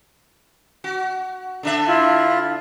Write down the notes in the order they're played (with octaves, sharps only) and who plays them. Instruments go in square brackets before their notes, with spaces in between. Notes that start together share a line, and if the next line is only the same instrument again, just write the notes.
[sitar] F#4
D3 D4 E5
[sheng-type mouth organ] E4 F4